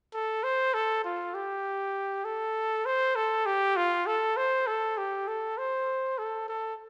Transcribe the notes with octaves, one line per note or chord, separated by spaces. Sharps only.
A4
C5
A4
F4
G4
A4
C5
A4
G4
F4
A4
C5
A4
G4
A4
C5
A4
A4